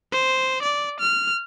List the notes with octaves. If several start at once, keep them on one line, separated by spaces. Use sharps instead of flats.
C5
D5
F6